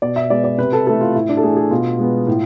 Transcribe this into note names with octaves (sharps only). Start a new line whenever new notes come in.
B2 D5
E5
G#3 B3 D5
D5
C3 B4
A4
E3 A3 A4
F4
A2 E4
D4
A4
E3 A3 G#4
G#4
B2 F4
G#3 B3
A2